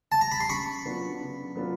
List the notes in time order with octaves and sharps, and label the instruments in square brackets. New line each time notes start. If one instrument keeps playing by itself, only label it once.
[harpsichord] A5
A#5
B5
C6
[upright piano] C#3 [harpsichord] B5 C#6
[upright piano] F#3 B3 D4 F4
C#3
F#3 B3 D4 F4